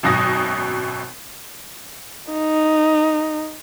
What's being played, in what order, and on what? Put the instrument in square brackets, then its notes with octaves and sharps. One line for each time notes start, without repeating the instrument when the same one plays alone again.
[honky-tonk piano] G#1 F#2 B2 D#6 A#6
[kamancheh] D#4